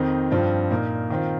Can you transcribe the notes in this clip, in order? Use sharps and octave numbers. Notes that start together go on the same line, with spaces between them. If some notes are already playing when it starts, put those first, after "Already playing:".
Already playing: F2 D#3 C4 D#4
G2 F3 C4 F4
A#2 A#3 D#4
D#3 C4 F4